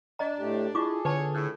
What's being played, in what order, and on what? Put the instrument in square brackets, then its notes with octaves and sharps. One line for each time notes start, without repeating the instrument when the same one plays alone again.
[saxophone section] D4 [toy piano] D5 D#5 A#5
[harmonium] A2 A3 G4
[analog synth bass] E4 [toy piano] F4 C#6 D6 [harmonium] G#4 A4
[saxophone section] E2 C#5 [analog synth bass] D3 [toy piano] B4 A5
[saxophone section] A2